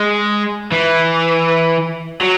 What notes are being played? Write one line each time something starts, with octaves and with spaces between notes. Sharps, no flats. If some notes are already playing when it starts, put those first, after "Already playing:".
Already playing: G#3
E3
F#3